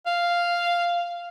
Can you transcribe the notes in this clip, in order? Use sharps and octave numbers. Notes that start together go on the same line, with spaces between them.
F5